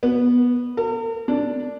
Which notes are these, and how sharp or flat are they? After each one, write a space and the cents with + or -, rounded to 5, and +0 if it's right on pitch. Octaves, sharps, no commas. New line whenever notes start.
B3 -10
A#4 -45
D4 -5